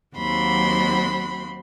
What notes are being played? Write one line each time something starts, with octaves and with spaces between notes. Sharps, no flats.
D#2 F#3 C4 F#4 B5 C6